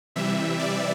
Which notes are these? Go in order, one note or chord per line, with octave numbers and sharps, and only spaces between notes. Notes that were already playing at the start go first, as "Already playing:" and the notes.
C3 E3 G3 E5
D5